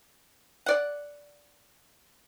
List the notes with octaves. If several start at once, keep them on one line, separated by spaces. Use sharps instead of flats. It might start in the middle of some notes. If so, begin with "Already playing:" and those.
D5 F#5